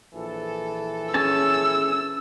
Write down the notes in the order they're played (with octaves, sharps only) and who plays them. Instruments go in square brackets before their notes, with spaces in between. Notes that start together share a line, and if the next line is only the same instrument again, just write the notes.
[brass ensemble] A#1 E3 A4
[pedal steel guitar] C#4 G#4 A5 [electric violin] E6